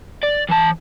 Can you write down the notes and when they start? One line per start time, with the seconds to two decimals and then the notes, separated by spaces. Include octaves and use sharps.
0.23 D5
0.50 E3 A5